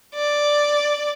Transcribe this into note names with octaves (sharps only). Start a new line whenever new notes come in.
D5